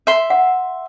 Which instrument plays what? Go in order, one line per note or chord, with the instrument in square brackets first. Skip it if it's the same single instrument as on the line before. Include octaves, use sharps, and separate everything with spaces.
[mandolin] E5 C6
[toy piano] F#5